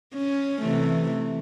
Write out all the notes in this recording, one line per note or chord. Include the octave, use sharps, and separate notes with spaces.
C#4
C3 E3 A3